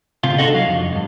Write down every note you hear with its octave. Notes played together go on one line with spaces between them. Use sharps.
C#2 C3 F4
D4 D#4 F4 F#4 A4 D#5
C2 F#3 F5
F2
D2 G2